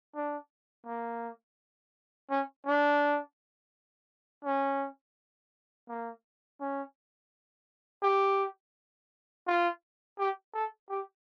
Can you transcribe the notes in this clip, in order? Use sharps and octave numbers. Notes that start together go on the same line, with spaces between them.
D4
A#3
C#4
D4
C#4
A#3
C#4
G4
F4
G4
A4
G4